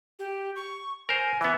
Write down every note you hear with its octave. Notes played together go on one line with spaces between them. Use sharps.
G4
C#6
A#4 C5 G#5
E3 B3 E5